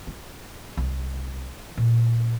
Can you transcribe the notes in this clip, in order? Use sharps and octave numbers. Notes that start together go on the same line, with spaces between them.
F4
C2
A#2